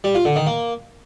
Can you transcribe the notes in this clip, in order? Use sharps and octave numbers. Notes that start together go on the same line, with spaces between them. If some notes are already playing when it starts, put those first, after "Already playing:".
G3
F4
D3
D#3
A#3